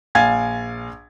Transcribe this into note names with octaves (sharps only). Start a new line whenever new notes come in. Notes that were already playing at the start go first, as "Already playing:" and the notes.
A#1 F5 G#5 G#6 A6